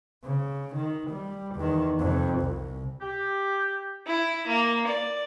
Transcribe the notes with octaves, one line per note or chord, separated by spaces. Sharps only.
C#3
D#3
G3
E2 D#3
F2 C3
C2
G4
E4
A#3
D5